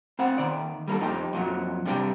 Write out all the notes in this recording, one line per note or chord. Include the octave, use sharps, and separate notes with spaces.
C4 C5 F5 F#5
D#2 D#3 D5
G3 A#3 D4 A4
F2 D#4 G4
F2 A#2 F#3
G2 C3 D4 G4 B4 G5